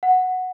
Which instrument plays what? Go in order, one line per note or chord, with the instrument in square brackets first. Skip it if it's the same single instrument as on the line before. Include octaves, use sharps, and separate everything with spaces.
[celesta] F#5